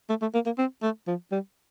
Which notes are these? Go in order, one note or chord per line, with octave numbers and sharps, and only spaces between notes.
A3
A3
A#3
A#3
C4
A3
F3
G3